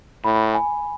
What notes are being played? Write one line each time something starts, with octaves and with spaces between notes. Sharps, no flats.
A2 B5
G#5